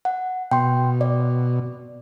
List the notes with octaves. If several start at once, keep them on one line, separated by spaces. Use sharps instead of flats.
F#5
B2 G5 C6
D5